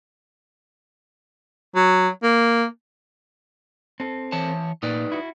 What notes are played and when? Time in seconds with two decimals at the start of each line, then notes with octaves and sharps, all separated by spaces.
1.75 F#3
2.23 A#3
4.00 C4 A4
4.32 E3 C#5 A5
4.83 A#2 D#4 B4 D5
5.12 E4 F#4